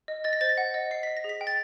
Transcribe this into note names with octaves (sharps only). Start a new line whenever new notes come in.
D#5
D#5 A6
A#6
C5 A6
A#6
F#5
D#5
D#5 C7
D#5 B6
A#6
G#4
B6
G5
A6